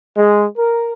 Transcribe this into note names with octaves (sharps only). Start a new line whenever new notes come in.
G#3
A#4